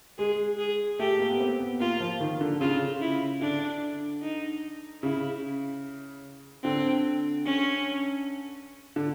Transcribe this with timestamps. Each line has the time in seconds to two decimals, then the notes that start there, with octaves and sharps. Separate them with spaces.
0.18 G#3 G#4
0.59 G#4
0.99 A3 G4
1.19 A#3
1.31 B3
1.40 C4
1.60 B3
1.80 A#3 F4
2.00 F3
2.20 D#3
2.41 D3
2.61 C#3 F4
3.01 E4
3.42 D3 D4
4.23 D#4
5.03 C#3 E4
6.64 D3 C4
7.45 C#4
8.96 D3